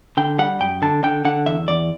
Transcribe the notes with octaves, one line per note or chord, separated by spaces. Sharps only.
D3 G5
G3 F#5
F#2 G5
D3 A5
D3 G5
D3 F#5
E2 E5
E2 D5